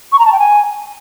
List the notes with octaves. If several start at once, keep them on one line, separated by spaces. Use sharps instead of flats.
C#6
A#5
A5
G5
G#5